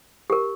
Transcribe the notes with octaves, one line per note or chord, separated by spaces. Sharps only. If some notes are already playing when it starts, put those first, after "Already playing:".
G4 A#4